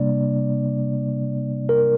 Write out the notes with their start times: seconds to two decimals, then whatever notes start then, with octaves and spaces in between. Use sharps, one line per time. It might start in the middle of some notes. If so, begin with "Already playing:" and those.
Already playing: C3 G3 A#3 D4 D5
1.69 A#4